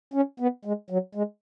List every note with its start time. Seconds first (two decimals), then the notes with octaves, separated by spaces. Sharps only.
0.14 C#4
0.40 B3
0.65 G#3
0.90 F#3
1.15 G#3